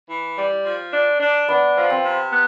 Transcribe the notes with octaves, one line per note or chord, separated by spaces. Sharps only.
E3
G3
F3
D4
D4
B3 D4
F3
C4
C3
B3